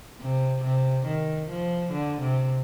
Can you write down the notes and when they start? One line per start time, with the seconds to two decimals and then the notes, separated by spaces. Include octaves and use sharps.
0.21 C3
0.64 C3
1.06 D#3
1.49 F3
1.93 D3
2.21 C3